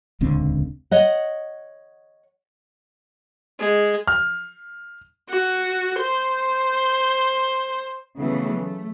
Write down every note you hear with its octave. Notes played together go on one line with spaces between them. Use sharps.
D#1 C#2 D3 C4
C#5 D#5 F#5
G#3
F6
F#4
C5
C#3 E3 F#3 A3 B3
A3